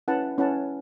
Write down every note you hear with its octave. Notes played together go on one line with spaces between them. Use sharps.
C#4 E4 B4 F#5 A5
C#4 E4 B4 F#5 A5